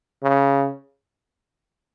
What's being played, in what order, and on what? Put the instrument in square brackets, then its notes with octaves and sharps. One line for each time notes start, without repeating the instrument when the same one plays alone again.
[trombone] C#3